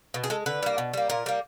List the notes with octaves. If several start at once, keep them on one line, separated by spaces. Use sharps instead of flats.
B2
G#4
G#3 A4
D3 B4
G3 A#3
B2
G3 A#3
A#2 A#4
G3 A#3